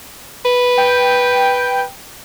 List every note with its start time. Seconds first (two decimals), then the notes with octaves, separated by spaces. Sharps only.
0.45 B4
0.78 G5